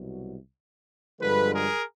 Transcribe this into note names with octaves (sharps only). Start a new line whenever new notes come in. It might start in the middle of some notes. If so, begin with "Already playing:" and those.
Already playing: C2 B2 F#3
G2 D3 F3 G#3 A4 B4
G#4 A#4